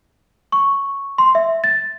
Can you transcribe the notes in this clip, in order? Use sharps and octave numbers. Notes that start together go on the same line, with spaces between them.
C#6
C6
E5
A6